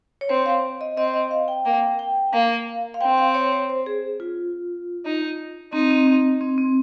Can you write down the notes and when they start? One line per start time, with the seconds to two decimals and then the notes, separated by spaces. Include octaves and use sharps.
0.21 C#5
0.29 C4 C5
0.46 F5
0.81 D#5
0.97 C4 D#5
1.14 D#5
1.31 F5
1.48 G5
1.65 A#3 G5
1.99 G5
2.33 A#3 F5
2.94 F5
3.01 C4 G5
3.17 F5
3.34 C#5
3.53 C5
3.70 C5
3.86 G#4
4.20 F4
5.05 D#4
5.73 C4 D#4
5.90 C4
6.07 C4
6.41 C4
6.58 C4